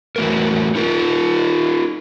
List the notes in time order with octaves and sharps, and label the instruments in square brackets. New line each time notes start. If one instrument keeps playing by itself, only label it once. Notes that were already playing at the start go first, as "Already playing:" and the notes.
[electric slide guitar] E3 F#3 A3 A4 A#4
D#4 F4 A#4